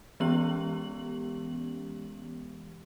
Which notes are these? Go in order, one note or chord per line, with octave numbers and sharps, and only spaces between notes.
E3 G#3 B3 C#4 G4 F#7